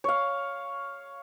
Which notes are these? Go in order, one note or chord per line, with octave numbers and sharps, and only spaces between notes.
C#5 F5